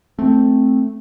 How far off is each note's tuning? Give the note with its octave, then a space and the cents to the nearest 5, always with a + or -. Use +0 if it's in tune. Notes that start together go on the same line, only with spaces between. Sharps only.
A3 +0 C4 +0